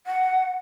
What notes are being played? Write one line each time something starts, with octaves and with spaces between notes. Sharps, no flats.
F#5